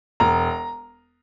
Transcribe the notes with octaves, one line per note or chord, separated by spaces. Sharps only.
E1 A#5